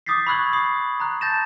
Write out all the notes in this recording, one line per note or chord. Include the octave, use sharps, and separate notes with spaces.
D6 D#6 G6 A6 B6 C7
B5 C#6 E6 F#6 G#6 F#7
D#6 C7 F#7
A#5 F#6
A5 G6 A6 A#6 E7